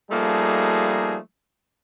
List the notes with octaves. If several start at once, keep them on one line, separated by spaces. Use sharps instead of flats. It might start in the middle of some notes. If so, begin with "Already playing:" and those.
F3 G3 A3 A#3 D#4 G#4